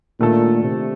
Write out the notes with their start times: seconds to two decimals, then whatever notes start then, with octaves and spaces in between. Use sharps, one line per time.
0.20 A#2 D#3 A3 D4 A4
0.64 C3